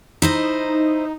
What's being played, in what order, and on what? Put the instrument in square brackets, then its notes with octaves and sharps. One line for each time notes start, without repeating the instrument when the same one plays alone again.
[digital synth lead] D#4 [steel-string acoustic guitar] E4 C5 D#5